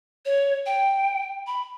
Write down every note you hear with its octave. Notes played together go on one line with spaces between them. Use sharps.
C#5
G5
B5